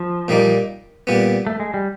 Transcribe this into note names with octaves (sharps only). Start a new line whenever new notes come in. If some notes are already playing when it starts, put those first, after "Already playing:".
Already playing: F3
A#2 G3 A#3 D#4
A#2 G3 B3
A3
G#3
G3